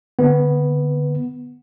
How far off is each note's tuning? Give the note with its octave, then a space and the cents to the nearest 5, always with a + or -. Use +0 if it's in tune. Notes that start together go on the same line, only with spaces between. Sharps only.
D3 +0 B3 +0